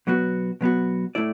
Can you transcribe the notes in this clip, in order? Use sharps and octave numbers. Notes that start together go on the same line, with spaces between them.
B2 F#3 B3 F#4
B2 F#3 B3 F#4
A2 A3 E4 D5